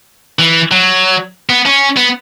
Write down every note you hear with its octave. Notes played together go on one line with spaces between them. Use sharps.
E3
F#3
B3
C#4
B3